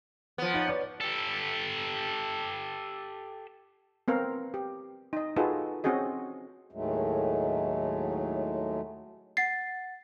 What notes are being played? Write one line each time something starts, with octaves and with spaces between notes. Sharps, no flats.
F3 B3
D#4 C#5 F#5
B4 C#5 D5
G4 A4
B3 C4 A#4 F5
G4
D#4 D#5
D#4 F4 F#4 G#4 A4 B4
C4 C#4 F#4 G#4 D#5
D#2 A2 D#3 F#3 G#3 A3
F#5 A6 C7